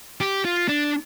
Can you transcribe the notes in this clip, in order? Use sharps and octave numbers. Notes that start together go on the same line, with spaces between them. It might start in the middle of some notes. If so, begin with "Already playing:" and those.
G4
F4
D4